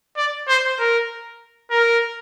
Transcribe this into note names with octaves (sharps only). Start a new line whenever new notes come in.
D5
C5
A#4
A#4